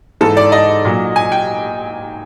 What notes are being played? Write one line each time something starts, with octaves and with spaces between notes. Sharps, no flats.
G#2 E3 A4
D5
D#5
A#2 F#3
G#5
G5